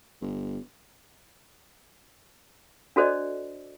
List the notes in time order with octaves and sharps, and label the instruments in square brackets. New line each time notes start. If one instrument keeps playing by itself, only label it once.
[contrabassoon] G1
[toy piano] D4 F#4 A4 C5 D5 D#5